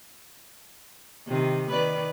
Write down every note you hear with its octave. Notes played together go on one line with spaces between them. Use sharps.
C3 D#3
D#3 B4 D5